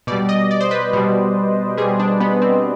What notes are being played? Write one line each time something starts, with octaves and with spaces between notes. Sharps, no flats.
B2 G3 D5
D#5
D5
C5
B4
B2 G3
B2 G3 G#4
D4
B3
C4